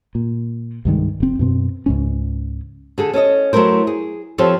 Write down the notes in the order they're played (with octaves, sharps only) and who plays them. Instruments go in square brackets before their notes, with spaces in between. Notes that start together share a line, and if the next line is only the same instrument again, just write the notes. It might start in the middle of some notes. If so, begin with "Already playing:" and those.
[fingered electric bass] A#2
C2 G2 D#3 G#3
F1 C4
F#2 B2 C4
C#2 G#2 C#4
[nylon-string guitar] D3 G#4 A4
C#4 A4 C#5 D#5
F#3 A3 E4 A#4 C5
G#4
F3 C4 G4 A4 C5 C#5